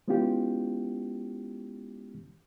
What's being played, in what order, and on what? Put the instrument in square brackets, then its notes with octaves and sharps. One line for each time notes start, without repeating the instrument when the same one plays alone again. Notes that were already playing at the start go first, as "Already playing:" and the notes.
[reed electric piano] G#3 B3 C#4 E4 F4 G4